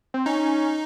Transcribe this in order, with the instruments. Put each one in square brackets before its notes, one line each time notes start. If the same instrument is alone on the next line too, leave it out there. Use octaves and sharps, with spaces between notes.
[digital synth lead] C4
[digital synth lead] C#4 [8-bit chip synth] D#4